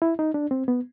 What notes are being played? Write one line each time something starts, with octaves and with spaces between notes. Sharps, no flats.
E4
D#4
D4
C4
B3